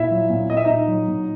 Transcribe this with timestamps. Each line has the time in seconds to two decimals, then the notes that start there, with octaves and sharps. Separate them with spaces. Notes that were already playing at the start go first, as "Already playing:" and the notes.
Already playing: A#2 E4 E5
0.11 F#3
0.30 A#2
0.50 A#2 D#5
0.57 E5
0.65 A#2 D#4 D#5
0.88 F#3
1.08 A#2